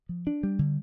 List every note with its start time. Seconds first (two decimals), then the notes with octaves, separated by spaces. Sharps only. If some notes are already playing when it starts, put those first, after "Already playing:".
0.09 F3
0.27 D4
0.43 G3
0.59 D3